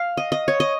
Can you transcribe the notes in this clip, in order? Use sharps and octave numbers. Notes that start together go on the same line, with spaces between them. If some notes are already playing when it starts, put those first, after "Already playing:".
Already playing: F5
D#5
D#5
C#5
D#5